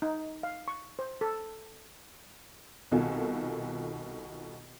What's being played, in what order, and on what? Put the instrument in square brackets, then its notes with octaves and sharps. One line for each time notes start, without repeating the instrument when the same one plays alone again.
[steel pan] D#4
F5
C#6
C5
A4
[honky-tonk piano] C2 B2 D#3 F4 A4 G#5